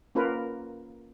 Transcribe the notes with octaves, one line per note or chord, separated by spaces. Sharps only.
A#3 C#4 F4 A#4 B4